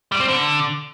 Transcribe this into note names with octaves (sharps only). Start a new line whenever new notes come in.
G3
C4
D3